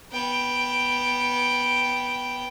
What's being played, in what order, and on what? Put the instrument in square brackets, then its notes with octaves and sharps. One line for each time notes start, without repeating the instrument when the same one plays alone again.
[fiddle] B3 G5